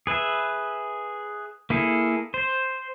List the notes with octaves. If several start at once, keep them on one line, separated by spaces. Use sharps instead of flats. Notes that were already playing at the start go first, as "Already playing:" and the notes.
G#4 B4 E5
A#3 E4 G#4 A4
C5